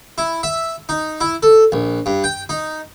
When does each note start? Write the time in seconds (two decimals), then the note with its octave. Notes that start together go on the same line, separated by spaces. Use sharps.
0.18 E4
0.43 E5
0.89 D#4
1.21 E4
1.43 A4
1.72 A#1
2.06 G2
2.24 G5
2.49 D#4